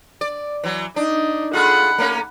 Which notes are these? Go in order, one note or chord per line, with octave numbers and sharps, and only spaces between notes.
D5
E3 F#3
D4 D#4
F4 G#4 A4 F#5 B5
A3 A#3 C#4